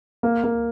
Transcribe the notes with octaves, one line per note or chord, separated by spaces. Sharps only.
A#3
A#3